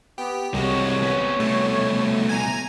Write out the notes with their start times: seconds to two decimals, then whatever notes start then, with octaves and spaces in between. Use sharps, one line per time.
0.18 B3 G4
0.54 C2 C3 G#3 F#4 C#5
1.03 B3 C#4
1.40 C2 B2 A3
2.29 G#5 A#5